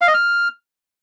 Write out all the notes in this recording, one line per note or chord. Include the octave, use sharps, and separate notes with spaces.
F5
D#5
F6